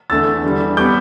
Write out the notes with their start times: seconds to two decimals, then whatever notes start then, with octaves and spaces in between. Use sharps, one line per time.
0.10 E2 D3 A3 E6 A6
0.44 E2 D3 G3
0.77 G3 B3 D6 G6